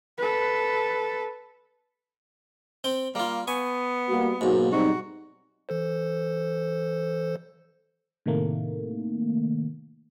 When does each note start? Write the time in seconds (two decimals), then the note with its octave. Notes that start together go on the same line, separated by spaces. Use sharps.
0.18 A4 B4
2.84 C4 G5
3.15 G3 A#3 F4
3.47 B3 G#5 C#6
4.09 G3 A#3 F#4
4.41 B1 G#2 A#3 F#4
4.72 G3 C4 D#4 F#4
5.69 E3 A4 C5
8.26 A2 C3 D#3 A3 A#3